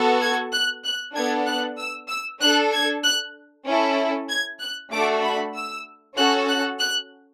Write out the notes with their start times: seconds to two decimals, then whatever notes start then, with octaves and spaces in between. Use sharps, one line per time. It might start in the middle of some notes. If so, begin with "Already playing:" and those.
Already playing: B3 F#4 A4
0.21 G#6
0.53 F#6
0.84 F#6
1.15 B3 D4 A4 G#6
1.47 F#6
1.78 E6
2.09 E6
2.41 D4 F#6
2.46 A4
2.72 G#6
3.04 F#6
3.66 C#4 E4 A4
4.29 G#6
4.60 F#6
4.92 A3 D4 F#4 A4 D6
5.23 B5
5.55 E6
6.17 C#4 F#4 A4 F#6
6.49 F#6
6.80 F#6